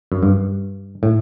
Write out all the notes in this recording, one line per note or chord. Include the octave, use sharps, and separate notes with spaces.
F#2
G2
A2